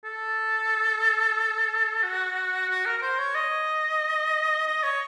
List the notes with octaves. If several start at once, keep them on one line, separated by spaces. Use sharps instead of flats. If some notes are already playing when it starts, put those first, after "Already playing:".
A4
F#4
F#4
A#4
A#4
C5
C#5
D#5
D#5
C#5